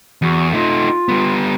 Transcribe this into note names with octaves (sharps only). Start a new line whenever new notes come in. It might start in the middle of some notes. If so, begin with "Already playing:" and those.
E2 F#4
A3 D#4 F4
G3 B3